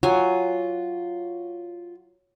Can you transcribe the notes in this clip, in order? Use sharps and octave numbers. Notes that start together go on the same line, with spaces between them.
F#3 F4 G#5